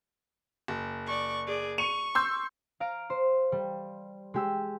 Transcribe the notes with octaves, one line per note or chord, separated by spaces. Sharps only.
F#1
D5 C#6
G#4 D5
C#6 C#7 D#7 F7
C6 E6 G6
F5 A#5 F6 D7
C5
G3
G#3 G4 E6